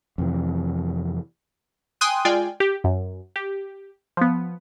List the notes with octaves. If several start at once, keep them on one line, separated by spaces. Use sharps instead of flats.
F2 C3 E3
G5 G#5 C6 D#6 F#6 D#7
G#3 F4 D5 G5 G#5
G4
F#2
G4
F3 B3